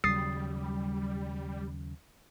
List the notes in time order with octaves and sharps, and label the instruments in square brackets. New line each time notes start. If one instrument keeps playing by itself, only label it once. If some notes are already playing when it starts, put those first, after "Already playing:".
[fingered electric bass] D#2 C#3 F#3 [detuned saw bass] G3 [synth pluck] D#6 A6 C7